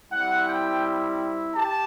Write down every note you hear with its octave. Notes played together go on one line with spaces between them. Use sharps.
G3 C4 E4 F#5
G5
G4 A5